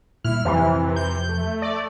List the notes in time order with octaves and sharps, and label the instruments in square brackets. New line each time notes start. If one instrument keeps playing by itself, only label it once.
[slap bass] A#2 G3 [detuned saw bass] E4 [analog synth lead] F6
[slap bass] F2 F3 [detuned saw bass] C3 [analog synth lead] E3
[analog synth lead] G6
[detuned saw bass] A3
[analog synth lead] D5